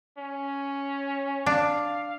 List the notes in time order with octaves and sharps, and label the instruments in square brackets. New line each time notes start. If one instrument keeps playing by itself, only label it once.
[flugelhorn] C#4
[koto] D4 [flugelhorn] F5